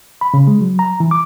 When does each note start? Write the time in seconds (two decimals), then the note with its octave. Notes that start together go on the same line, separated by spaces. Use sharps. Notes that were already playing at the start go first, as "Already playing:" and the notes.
0.21 B5
0.34 C#3
0.47 G#3
0.61 F#3
0.79 A#5
1.00 E3
1.11 D6